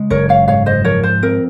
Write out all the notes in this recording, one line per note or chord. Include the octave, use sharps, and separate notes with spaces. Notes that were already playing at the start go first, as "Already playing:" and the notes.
Already playing: C#3 G#3
F#1 A#4 C#5
C#5 F5
G#2 C#5 F5
C5 D#5
F3 A#4 C#5
C5
C4 A#4